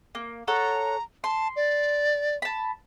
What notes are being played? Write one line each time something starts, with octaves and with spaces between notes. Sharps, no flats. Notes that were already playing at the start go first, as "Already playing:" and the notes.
A#3
A4 C#5 F#5 A#5
A5 C6
D5
A5 B5